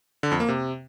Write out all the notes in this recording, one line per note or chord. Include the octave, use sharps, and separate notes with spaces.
D3
F2
A#3
C3